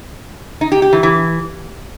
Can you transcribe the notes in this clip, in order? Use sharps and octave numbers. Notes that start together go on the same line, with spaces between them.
D#4
G4
G4
E3
E3